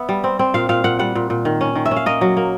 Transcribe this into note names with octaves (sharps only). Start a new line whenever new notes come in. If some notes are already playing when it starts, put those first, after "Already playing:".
Already playing: B3 E5
G3
C4
C4
A#2 F5
A#2 F5
A#2 F#5
G3 F#5
A#2
A#2
D#3
C#4
D#3
E5
C#4
F5
A#3 D#5
F#3
A#3